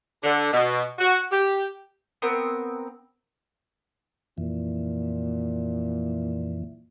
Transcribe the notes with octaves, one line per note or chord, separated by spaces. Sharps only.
D3
B2
F#4
G4
B3 C4 A#4
F2 A#2 E3